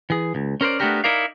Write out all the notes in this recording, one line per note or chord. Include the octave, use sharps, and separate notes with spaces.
E3 G#4
C#2
C#4 A#4 C5 D5
A3 B3 D4 F#4 G4 A#4
D#4 E4 A#4 D5 F5